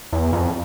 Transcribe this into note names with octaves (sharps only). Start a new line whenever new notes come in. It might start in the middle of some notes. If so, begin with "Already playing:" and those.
E2
F2